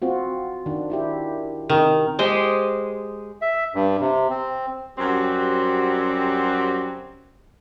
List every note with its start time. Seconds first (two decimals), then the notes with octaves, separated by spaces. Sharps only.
0.02 C4 F4 F#4
0.66 D#3 D4
0.90 D4 E4 G4
1.69 C3 D#3 D#4
2.19 G#3 G4 G#4 C5
3.42 E5
3.75 G2
4.01 C3
4.30 C4
4.98 F#2 G3 C4 F#4 G4